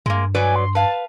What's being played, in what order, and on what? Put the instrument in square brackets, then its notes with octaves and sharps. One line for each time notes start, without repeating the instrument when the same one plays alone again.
[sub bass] G2 [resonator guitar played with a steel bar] G#3 A#3
[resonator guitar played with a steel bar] F#3 B4 D5 [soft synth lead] G#5
[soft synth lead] C6
[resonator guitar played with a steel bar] B4 F5 [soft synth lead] A5